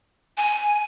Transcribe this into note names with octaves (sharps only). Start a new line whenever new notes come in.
G#5